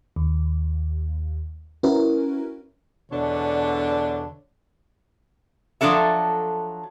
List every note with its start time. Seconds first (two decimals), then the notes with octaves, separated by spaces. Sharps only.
0.16 D#2
1.83 C#4 E4 F#4 A#4 B4
3.09 E2 B2 D3 D4 C#5
5.81 F3 F#3 D4 A4 E5